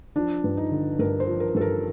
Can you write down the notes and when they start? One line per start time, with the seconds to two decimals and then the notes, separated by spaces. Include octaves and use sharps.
0.16 F3 D4
0.44 G2
0.57 D#4
0.71 D3
0.99 G2 A#4
1.20 C5
1.27 F3
1.40 A#4
1.55 G2 A4
1.61 A#4